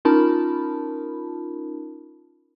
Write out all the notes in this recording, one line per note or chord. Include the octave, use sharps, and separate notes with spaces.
C#4 D#4 F4 A#4 A5 B5